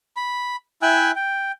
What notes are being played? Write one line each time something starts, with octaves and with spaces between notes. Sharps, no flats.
B5
E4 E5 G5 G#5 E6 F#6
G5